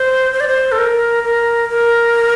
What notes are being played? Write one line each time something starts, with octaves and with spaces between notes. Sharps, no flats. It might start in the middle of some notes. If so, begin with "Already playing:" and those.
Already playing: C5
C5
D5
C5
A4
A#4
A#4
A#4